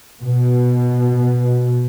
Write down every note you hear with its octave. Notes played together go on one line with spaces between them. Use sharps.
B2